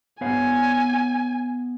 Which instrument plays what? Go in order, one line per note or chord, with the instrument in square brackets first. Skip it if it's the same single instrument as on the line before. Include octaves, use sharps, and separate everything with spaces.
[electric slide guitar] B3 C#5 F5 [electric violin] G#5